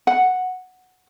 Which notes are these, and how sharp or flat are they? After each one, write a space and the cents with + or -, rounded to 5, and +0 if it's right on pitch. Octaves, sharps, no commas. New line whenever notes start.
F#5 -5